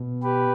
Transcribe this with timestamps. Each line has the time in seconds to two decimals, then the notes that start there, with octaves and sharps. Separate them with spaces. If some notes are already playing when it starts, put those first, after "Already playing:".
Already playing: B2
0.23 G4 B4